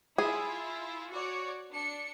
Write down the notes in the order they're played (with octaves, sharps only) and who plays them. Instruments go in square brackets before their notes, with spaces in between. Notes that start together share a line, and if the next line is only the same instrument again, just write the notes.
[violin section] E4 F4 [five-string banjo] G#4
[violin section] F#4 C#5 D5
D4 C#7